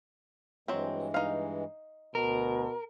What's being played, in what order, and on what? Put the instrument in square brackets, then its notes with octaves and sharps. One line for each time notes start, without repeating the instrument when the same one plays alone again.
[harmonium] G2 E3 G#3 [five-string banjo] F#3 C4
[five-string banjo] D#4 F5
[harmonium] D2 [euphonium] B2 [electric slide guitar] A#4